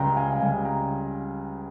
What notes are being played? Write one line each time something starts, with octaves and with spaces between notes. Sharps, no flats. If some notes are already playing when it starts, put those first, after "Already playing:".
Already playing: C#2 C#3 G3 G5 A#5
F5 G#5
C#2 C#3 G3 F5 G#5
G5 A#5